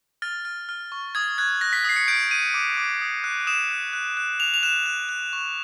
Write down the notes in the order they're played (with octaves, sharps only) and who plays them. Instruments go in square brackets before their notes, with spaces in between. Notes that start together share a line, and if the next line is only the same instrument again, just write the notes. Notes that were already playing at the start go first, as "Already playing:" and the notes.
[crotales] F6 A6
F6
F6
C#6
D#6 G#6
F#6 G#6
F#6 A#6
B6
D#6 C7
C#7
G6 D7
G6 D#7
D6
D6
D#6
F#6
D#6 E7
F#6
F#6
F#6
F#6 F7
F7
F#6 E7
F#6
F#6
C#6